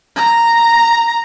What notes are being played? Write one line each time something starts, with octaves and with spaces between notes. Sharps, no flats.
A#5